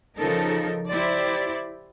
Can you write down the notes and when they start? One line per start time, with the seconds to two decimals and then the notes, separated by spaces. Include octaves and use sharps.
0.17 C#3 F3 D#4 A4 A#4
0.87 E4 G4 C5 D5